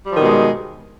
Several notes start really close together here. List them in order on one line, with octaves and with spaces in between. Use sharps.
G3 F3 D#3 B2 G#3